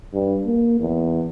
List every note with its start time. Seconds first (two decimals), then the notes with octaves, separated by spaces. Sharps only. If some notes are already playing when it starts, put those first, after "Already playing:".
0.13 G2
0.46 A#3
0.80 E2